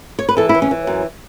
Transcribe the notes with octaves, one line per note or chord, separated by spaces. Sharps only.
C#5
B4
E3 A4
E4
E3
C#4
E3
F#2